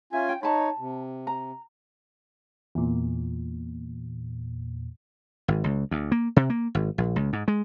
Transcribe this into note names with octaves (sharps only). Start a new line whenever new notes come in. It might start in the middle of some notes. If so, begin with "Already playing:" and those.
C#4 F4 E5 G#5
G5
D#4 C#5 A5 B5
C3
A#5
E2 A#2
G#1
C#2
D2
A#3
C3
A#3
G#1
A#1
C#2
G#2
G#3